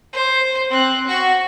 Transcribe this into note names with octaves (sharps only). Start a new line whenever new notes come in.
C5
C4 F#6
F#4 C#6